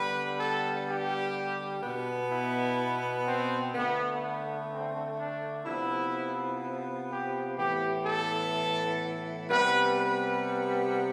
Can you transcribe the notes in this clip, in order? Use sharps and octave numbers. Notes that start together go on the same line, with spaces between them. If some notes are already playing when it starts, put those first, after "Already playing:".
Already playing: D3 G3 B3 B4
A4
G4
B2 B3
E4
C4
D3 A3 B3
B3
C4
D4
C3 F3 B3 E4
G4
A2 E3 B3 G4
A4
C3 G3 B3 B4
B4